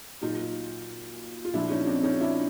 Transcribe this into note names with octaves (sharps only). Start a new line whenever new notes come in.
A#2 F#3 D#4 F4
F4
A#2 F3 D4 E4
C#4 D#4
C4 D4
C#4 D#4
D4 E4